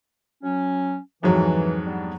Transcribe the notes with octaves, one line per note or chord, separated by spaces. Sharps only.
F#3 C#4
F2 G#2 E3 F#3
G3 B3 D4